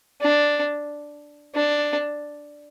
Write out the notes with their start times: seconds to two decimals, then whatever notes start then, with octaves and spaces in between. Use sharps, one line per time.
0.21 D4
1.54 D4